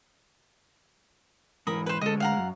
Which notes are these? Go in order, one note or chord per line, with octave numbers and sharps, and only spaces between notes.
G#2 E3 A#4 B5 D#6
B4 C5
D2 G#3 A4 D#5
F5 F#5 A#5
F#2